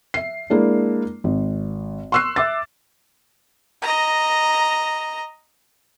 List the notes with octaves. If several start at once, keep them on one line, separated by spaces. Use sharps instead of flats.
E5 C7
G#3 A#3 D4 E4
G#1
C6 C#6 E6 F#6 C7
E5 D6 A6
D#5 A#5